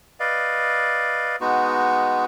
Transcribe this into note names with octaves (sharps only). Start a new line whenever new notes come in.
B4 D5 D#5 F5
G#3 B3 D#4 F#4